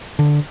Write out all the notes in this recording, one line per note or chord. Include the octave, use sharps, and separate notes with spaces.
D3